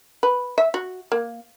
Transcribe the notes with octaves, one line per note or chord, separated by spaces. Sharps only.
B4
E5
F#4
A#3